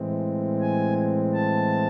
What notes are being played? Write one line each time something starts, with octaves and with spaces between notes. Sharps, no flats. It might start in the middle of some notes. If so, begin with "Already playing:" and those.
Already playing: A2 E3 G#3 C4
G#5
A5